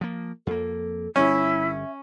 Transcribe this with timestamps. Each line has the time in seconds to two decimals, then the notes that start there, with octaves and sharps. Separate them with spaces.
0.01 F3 A#3
0.47 F2 A#3 A4
1.16 G1 G3 C#4 E4 E5